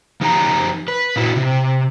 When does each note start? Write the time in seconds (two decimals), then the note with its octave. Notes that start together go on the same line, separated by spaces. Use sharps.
0.21 F3 D#4 G4 A#5
0.88 B4
1.16 A#2 E4 F#4
1.36 C3